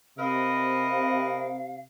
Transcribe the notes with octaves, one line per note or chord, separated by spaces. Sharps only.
C3 A#4 B4 D#5 F5